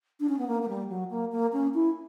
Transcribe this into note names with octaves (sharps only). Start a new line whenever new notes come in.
D4
C#4
B3
A#3
A#3
G3
F#3
A#3
A#3
C#4
E4